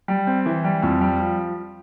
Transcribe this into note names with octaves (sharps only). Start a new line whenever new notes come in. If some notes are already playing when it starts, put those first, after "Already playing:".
G3
C4
E3
G3
F2
G3
F3